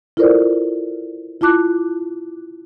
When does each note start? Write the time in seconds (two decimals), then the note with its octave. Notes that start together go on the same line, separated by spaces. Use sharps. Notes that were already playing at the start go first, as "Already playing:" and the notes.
0.17 E4 F4 A4 A#4 C5 D5
1.41 E4 F4 A5 D6 F#6